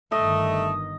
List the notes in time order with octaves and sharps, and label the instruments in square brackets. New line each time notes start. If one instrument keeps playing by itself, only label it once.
[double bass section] G1 G2 D#3 [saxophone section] A3 [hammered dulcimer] D#5